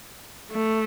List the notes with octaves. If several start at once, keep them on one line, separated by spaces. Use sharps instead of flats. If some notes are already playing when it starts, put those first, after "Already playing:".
A3